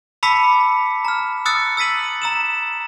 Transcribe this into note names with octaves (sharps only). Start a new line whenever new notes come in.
A5 B5 D6 E6 B6 C#7
A#5 F6
D#6 E6 F#6 A6 C#7
E6 A6 B6 D#7 F#7
A#5 E6 E7